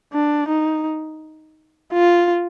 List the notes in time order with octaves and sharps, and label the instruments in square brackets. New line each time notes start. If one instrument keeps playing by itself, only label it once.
[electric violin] D4
D#4
F4